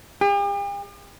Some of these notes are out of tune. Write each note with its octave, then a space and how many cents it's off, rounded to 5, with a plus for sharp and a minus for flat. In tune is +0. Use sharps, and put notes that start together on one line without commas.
G4 +45